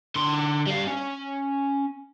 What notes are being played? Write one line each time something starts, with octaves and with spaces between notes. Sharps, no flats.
D3 C6
G3 F5
C#4